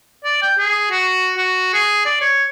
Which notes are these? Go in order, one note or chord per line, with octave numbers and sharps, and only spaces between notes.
D5
G5
G#4
F#4
F#4
G#4
D5
C#5